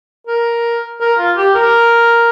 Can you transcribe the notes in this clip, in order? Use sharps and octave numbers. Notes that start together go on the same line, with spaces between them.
A#4
A#4
F4
G4
A#4